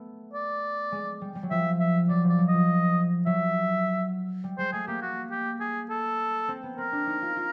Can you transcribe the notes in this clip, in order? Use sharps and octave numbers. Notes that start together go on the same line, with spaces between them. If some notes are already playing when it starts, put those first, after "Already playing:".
Already playing: A3 B3
D5
G#3
G3
G3
F#3
F3 E5
E5
F#3 D5
F3
D5
F#3
F3 D#5
F#3 E5
G3
G#3 C5
A3 G#4
A#3 G4
F#4
G4
G#4
A4
C4
B3
C4 A#4
D4
D#4
F4
F4